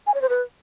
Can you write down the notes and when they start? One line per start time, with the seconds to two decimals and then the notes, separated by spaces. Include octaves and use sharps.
0.07 G#5
0.14 C#5
0.22 C5
0.29 B4